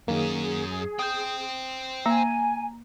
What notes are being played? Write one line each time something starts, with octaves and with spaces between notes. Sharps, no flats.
F#2 D#3 A#3 C#4 G#4
C5 G5 D#6 G6
A#3 G#5 A#5